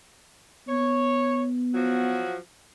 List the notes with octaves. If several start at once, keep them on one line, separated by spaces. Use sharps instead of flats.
B3 C#5
F3 F#3 F#4